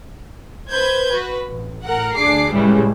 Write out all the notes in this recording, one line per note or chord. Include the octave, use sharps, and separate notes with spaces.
B4 C5 G6 G#6
F#4 B4
A1
A2 A#4 F#5
D2 D4 G#4 D6 C7
A2 C#3 E3 G3 G#3